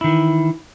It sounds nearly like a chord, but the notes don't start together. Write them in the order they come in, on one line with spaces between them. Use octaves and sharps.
E4 D#3 E3